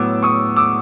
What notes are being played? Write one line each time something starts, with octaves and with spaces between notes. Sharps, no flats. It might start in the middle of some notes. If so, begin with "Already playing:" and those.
Already playing: A2 F#3 B3 D6 E6
C#6 D#6
D6 E6